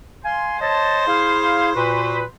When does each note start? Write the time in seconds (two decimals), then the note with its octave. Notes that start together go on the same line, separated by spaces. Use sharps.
0.25 F5 G#5 C6
0.61 C5 C#5 D#5 A5
1.08 E4 G#4 F5
1.75 A#2 F#4 B4